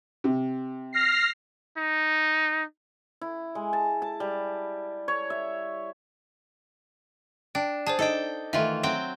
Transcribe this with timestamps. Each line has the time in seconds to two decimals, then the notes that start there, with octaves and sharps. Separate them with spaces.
0.24 C3
0.93 F6 A#6 C7
1.77 D#4
3.21 E4
3.55 G#3
3.73 A5
4.02 A5
4.20 G3
5.08 C#5
5.30 E5
7.55 D4 G5
7.87 G#4 C5 D5 A5
7.99 D4 D#4 A4 D#5 G5
8.53 D#3 E3 A3 F4 E5
8.83 F#3 C4 G5